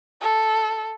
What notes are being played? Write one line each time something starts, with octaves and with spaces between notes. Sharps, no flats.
A4